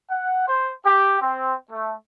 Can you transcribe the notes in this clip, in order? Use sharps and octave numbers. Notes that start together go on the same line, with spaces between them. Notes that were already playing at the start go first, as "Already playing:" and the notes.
F#5
C5
G4
C4
A3